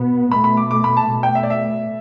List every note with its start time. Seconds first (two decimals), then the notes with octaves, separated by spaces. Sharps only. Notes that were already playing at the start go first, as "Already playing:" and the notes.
Already playing: B2 B3
0.32 B2 A3 B5
0.44 B5
0.57 D6
0.71 D6
0.84 B5
0.97 A5
1.10 B2 A3
1.23 G5
1.35 E5
1.43 D5
1.50 E5